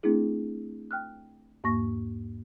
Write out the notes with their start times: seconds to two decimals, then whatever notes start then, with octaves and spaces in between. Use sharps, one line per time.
0.03 A3 C4 D4 E4 G#4
0.91 G5 F6 F#6
1.64 E2 G#2 A#3 C#6 A#6